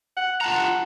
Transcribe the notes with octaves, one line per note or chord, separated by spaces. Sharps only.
F#5
F4 F#5 A5 A#5